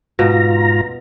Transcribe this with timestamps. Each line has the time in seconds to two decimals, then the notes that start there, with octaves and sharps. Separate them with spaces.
0.19 G#2 B2 F4 A#5